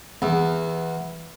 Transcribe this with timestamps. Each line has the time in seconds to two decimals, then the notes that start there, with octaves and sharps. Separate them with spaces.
0.22 E2